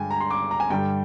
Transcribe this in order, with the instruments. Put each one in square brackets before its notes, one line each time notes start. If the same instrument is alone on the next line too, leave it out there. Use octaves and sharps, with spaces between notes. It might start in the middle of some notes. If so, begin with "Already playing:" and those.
Already playing: [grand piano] G2 D3 G#3 G5 G#5
A#5
C6
D6
A#5
G#5
G2 D3 G3 G5